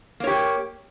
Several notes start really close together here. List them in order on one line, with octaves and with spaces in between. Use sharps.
A#3 C#5 G4